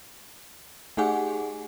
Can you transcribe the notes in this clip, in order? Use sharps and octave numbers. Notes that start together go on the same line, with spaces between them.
A3 D#4 G4 G#4 F#5 G#5